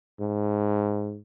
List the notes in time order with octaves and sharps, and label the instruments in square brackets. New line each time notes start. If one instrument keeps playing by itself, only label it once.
[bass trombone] G#2